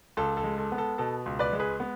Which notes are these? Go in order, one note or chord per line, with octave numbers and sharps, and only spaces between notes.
C#2 A4
A4
G#3
A4
B3
A4
B2 A4
C#2
B4 D5
G#3
G#4 B4
B3